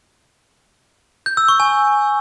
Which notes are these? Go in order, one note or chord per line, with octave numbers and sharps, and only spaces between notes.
G6
E6
C#6
G#5